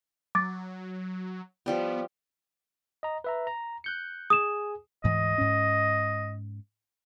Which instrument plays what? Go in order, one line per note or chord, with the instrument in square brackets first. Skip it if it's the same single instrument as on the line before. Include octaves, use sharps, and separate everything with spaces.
[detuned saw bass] F#3 [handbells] D6 A6
[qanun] F3 G3 G4 [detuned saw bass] B3
[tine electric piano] D#5 A#5
B4 E5 A#5
A#5
F#6 G6 C#7
[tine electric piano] G#4 G#5 [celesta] D#6 E7
[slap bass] D2 G#2 E3 [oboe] D#5
[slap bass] G#2 C#4